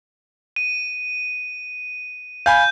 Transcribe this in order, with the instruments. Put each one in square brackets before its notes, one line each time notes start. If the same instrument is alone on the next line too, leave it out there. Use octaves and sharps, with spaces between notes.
[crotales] D#7
[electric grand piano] F5 G#5 B5 [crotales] G6